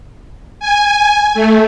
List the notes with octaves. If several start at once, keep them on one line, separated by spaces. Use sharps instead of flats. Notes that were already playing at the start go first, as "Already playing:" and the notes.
G#5
A3